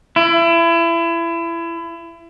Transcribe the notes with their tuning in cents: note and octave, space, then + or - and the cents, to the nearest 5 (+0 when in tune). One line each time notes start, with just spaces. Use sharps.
E4 +30